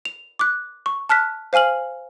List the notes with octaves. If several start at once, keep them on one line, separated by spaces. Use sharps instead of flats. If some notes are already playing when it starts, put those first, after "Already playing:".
F7
D6 F#6
C#6
A5 F6 F#6 B6
C5 F5 G#5 F6 F#7